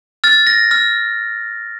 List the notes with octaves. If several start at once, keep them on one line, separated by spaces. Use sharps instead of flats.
F6 A6
A#6
F6